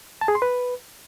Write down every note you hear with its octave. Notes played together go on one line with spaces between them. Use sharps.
A5
G#4
C6
B4